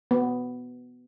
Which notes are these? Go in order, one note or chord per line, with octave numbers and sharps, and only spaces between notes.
B3